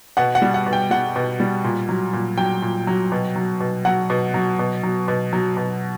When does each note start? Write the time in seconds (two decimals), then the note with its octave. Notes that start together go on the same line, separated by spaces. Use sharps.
0.17 B2 F#5
0.35 F#5
0.42 G3
0.54 F#5
0.66 B2
0.73 G5
0.91 G3 F#5
1.16 B2
1.40 G3
1.64 A#2
1.89 F#3
2.13 A#2
2.38 F#3 G5
2.62 A#2
2.87 F#3
3.12 B2
3.36 F#3
3.61 B2
3.85 F#3 F#5
4.10 B2
4.34 F#3
4.59 B2
4.83 F#3
5.08 B2
5.33 F#3
5.57 B2